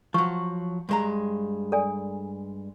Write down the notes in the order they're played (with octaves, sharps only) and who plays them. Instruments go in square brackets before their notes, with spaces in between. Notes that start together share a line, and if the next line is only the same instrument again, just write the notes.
[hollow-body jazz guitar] F3 F#3 [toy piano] C#6
[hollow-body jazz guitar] G2 G#3 A#5
[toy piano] A4 D5 G#5